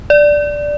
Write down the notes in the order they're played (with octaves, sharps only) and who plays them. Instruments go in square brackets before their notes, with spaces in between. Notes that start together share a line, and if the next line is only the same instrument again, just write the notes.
[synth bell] D5